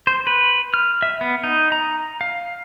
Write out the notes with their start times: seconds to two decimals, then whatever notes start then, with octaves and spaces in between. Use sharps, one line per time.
0.07 C5
0.27 B4
0.74 F6
1.02 E5
1.21 B3
1.44 D#4
1.72 A#5
2.21 F5